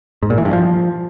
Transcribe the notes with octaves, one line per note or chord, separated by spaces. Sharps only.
G#2
A#2
E3
G2
F3